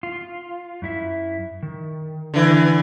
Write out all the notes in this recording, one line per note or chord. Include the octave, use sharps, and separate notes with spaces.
F4
F#2 E4 E5
D#3
D3 E3